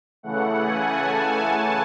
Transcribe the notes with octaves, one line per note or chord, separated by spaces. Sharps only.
C#3 E3 A3 F#5
G#5
A5